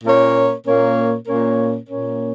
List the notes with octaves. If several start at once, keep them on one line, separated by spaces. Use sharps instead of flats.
A#2 A#3 C#4 A#4 C#5
A#2 A#3 C#4 A#4 C#5
A#2 A#3 C#4 A#4 C#5
A#2 A#3 C#4 A#4 C#5